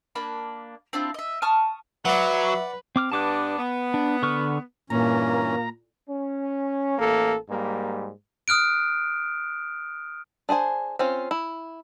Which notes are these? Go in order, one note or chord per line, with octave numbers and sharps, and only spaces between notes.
A#3 D4 B5
C4 D4 E4 F4
D#5 E5
A5 C#6 D#6 F6
F#3 B4 D5 E5 F#5
C4 D6 F6
G2 B3 D4 A5 D6 F#6
B3
D4
D3 C#6 F6
G2 A#2 E3 A#3 C#4 A#5
C#4
A1 A#3 A4
G#2 G3 A#3
D#6 F6 F#6 D7
D4 G#4 C5 G#5
C4 C#4 F4
E4